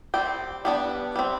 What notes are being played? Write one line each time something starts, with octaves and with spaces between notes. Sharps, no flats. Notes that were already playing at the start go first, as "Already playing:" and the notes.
G3 C4 G5
G3 B3 D4
G3 C4